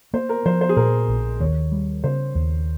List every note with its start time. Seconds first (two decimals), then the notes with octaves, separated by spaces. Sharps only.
0.14 A#3 C5
0.29 A#4
0.46 F3 C5
0.61 C5
0.69 G#4
0.76 A#2 A#4
1.08 A#1
1.40 D#2 C#5
1.72 G3
2.04 C#3 C5
2.35 D#2